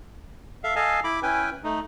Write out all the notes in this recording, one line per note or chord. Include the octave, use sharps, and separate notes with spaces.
A4 E5 F5
A4 D#5 F5 G#5 A5
E4 B5 D6
C#4 E4 B4 G5 G#5
A3 D#4